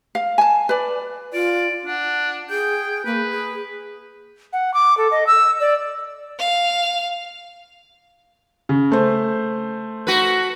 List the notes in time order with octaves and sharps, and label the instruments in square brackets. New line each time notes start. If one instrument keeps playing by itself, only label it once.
[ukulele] F5
G#5 A5
B4 D5
[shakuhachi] F4 [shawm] D5
[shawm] D4 [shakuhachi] F#5
[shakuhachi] G#4 [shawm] G5
[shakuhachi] A#3 [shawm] B4
[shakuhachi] G#4
[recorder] F#5
D6
A4
D#5
E6
D5
[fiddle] F5
[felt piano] C#3
A3 C5
[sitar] F#4 B4